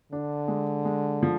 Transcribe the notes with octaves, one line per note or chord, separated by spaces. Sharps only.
D3 D4
G#3
G#3
F3